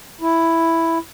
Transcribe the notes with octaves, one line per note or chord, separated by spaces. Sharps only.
E4